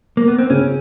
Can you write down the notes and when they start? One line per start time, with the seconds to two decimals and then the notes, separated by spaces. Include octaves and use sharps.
0.17 A#3
0.28 B3
0.38 C4
0.50 C#3 C#4